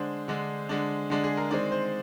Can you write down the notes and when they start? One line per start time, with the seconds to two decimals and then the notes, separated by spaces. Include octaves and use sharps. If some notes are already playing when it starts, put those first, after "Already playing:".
Already playing: D3 G#3 D4 C5
0.28 D3 G#3 D4
0.69 D3 G#3 D4
1.10 D3 G#3 D4
1.24 G#4
1.37 A#4
1.51 D#3 G#3 C4 D5
1.72 C5